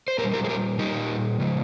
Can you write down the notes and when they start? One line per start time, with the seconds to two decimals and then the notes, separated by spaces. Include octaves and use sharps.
0.08 C5
0.18 A#2 G4 A#4
0.24 G3
0.34 G4 A#4
0.44 G#4
0.49 G4 A#4
0.79 A#2 G3 D#4 G4
1.40 C#3 F3 G#3